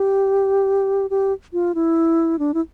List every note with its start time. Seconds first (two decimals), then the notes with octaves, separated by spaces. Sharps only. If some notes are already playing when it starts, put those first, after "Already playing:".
Already playing: G4
1.10 G4
1.53 F4
1.75 E4
2.39 D4
2.54 E4